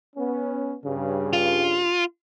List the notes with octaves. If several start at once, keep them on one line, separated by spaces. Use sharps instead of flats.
B3 C#4
G2 C#3
F4